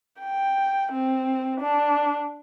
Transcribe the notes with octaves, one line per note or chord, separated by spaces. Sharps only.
G5
C4
D4